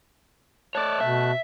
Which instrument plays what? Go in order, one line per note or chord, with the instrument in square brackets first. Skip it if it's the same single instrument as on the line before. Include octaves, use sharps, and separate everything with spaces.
[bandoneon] A3 A5 F#6 [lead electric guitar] C#5 D5
[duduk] B2 [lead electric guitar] E5